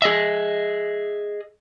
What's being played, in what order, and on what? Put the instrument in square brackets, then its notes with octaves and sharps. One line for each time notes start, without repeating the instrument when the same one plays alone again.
[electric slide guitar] G#4 D#5 E5